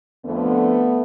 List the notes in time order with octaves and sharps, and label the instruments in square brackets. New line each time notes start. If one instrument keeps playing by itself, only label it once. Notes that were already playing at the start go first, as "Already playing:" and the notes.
[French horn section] F2 D3 A3 B3